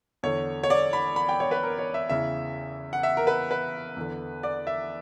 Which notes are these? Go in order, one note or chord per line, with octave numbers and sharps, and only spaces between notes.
E2 D3 C#5
C#5
D5
B5
B5
G5
C#5
B4
A#4
C#5
E5
E2 C#3 E3 E5
F#5
E5
A#4
B4
B4
E2 D3
D5
E5